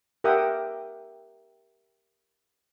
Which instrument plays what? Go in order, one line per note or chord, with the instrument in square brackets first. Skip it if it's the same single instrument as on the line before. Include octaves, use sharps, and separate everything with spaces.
[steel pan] G4 A#4 E5 F#5 G5 D#6